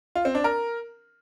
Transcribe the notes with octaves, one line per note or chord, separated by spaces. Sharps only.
F4
C4
D4
A#4